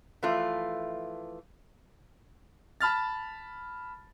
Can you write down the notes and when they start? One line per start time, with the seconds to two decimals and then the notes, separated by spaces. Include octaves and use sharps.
0.23 E3 F3 A3 F4
2.81 A5 B5 F6 A6